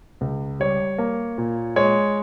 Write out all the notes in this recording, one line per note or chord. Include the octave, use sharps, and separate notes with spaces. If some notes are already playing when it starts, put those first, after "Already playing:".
C#2
G3 C#5
A#3
A#2
G#3 C#5